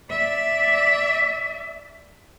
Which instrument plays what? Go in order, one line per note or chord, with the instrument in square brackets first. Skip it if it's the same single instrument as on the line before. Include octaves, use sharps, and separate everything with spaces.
[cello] D5 E5